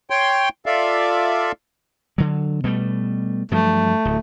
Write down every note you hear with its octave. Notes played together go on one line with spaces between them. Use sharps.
C#5 G5 C6
F4 A4 D5 E5 F5
D3 F#3
B2 G3 A3
G2 F3 F#3 A3
D1